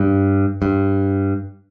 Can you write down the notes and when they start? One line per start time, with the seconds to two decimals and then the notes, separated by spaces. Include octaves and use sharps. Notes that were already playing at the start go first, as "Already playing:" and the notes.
Already playing: G2
0.62 G2